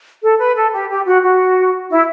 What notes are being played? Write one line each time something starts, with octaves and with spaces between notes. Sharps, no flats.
A4
B4
A4
G4
G4
F#4
F#4
E4